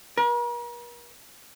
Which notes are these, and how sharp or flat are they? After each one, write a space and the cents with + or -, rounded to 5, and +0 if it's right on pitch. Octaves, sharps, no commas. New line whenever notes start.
A#4 +45